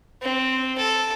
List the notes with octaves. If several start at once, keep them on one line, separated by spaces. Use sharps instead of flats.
C4
A4